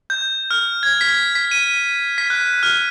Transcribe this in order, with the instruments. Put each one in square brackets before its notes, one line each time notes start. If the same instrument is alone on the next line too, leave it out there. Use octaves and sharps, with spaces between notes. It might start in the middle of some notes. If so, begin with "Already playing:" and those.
[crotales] G6
F6
G#6
B6
B6
D#7
B6
F#6
F6